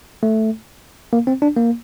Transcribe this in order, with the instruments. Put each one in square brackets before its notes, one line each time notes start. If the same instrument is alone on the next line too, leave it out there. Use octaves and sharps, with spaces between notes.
[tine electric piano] A3
A#3
C4
D4
A#3